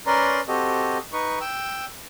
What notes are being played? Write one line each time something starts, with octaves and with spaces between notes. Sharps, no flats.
C#4 A#4 B4 D5 A#5 C6
C4 F#4 G4 A4 D#5
D#4 B4 C#6
G5 E6